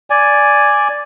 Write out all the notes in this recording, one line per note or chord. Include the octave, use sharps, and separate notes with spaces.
D5 G#5